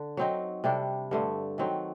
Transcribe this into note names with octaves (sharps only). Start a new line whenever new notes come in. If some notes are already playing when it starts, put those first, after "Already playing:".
Already playing: D3
F#3 C4 D#4
C3 G3 D4 A4
G2 D3 A3
D#3 F#3 C4